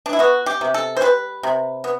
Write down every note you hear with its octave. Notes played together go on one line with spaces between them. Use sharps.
D4
E4
B3 F#4
G4
C3
A4
C5
G3 B4
C3
B3